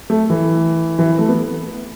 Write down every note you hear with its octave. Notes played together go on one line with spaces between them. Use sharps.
A3
E3
E3
A3
B3